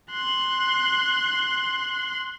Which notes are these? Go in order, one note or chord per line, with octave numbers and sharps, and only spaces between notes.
C6 F#6